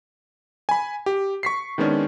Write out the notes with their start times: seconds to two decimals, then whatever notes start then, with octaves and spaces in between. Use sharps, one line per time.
0.69 G#5 B5
1.06 G4
1.43 C#6 B6 C7
1.78 D#3 G#3 B3 C#4 D4